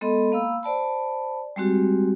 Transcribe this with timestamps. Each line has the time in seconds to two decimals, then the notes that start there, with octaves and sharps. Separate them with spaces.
0.01 G#3 B3 A4 D#5 B5 C6
0.32 A#3 F5 B5 E6
0.63 C5 D5 A5 B5
1.56 G3 G#3 C4 F#4 G4